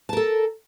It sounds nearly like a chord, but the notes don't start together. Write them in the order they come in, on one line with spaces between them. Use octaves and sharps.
A5 A#4 A4